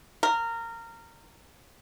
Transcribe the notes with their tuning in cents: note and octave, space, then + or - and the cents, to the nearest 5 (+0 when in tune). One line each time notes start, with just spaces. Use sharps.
A#4 -20